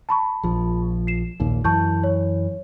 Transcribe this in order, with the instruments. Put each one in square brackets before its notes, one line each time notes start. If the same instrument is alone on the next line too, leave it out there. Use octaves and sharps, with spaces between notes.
[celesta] A5 B5 C#6
[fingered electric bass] A#1 F3
[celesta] C7 E7
[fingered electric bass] A#1 D#2 A#2 [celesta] D#4
[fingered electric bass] F#2 E3 [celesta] A5 C#6 G6
[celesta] C#5